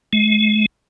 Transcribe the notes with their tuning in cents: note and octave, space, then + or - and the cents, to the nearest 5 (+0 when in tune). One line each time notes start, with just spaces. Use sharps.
G#3 +45